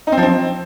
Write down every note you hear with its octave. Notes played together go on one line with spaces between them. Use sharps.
D#4
C4
F3
C4